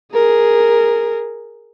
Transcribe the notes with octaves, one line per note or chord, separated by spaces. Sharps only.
G#4 A#4